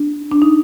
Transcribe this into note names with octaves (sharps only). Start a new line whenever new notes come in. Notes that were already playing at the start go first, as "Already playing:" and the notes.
Already playing: D4
D4
D#4